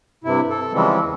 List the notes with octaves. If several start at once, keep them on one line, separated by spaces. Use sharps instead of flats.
G2 C3 E4
A4
C#3 E3 F3 G3 G#3 C4
E2